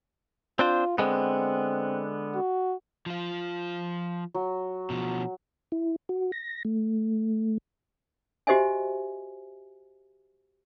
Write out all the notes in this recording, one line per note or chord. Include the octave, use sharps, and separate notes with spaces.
C4 D4 F4 C5
D3 G#3 B3 C4
F#4
F3 F4
F#3
B2 F3
E4
F#4
A#6
A3
F#4 G4 C5 D#5 E5 G#5